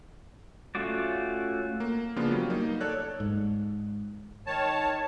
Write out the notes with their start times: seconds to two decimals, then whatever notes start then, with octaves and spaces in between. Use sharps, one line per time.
0.75 A3 C#4 F4 F#4 D5
1.80 A#3
2.16 C#3 F3 A#3 B3 D4 F4
2.31 F#3 G3
2.50 A#3 D#4
2.81 A4 C#5 D5 F#6
3.20 G#2
4.46 D#3 C#5 A5